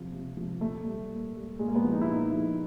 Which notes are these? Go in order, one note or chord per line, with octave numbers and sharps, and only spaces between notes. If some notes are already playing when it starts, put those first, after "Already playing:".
Already playing: C3 F3
C3
F3
A#2 A3
G3
A#2
G3
A#2 G#3
A#3
B3
F3
D#4
E4
A#2 D#4
F3